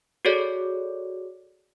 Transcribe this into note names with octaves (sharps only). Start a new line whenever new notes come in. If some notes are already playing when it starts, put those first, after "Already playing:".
F#4 G#4 A4 C#5 D5